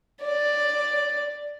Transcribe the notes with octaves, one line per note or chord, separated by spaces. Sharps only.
D5